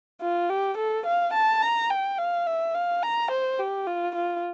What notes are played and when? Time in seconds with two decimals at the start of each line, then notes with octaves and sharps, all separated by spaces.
0.21 F4
0.50 G4
0.77 A4
1.06 F5
1.33 A5
1.62 A#5
1.90 G5
2.18 F5
2.46 E5
2.75 F5
3.03 A#5
3.31 C5
3.59 G4
3.87 F4
4.15 F4